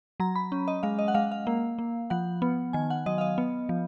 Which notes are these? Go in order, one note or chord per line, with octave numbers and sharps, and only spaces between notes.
F#3 A#5
B5
C#4
D#5
G#3 F5
D#5
F#5
G#3 F5
F5
A#3
A#3
F3 F#5
B3
D#3 G#5
F#5
F#3 D#5
F5
D#5
B3
F3